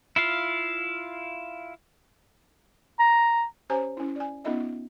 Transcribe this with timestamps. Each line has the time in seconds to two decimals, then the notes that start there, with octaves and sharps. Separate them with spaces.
0.16 E4 F4 F5
2.99 A#5
3.70 C#4 G4 C5 C#5 G#5 A#5
3.97 C#4 E4
4.16 D5 G#5
4.44 B3 C#4 D#4 F4 D#5 E5